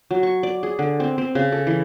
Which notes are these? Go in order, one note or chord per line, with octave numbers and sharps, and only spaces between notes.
F#3
C#6
D5
G#4
D3
C4
C4
C#3
A4
E3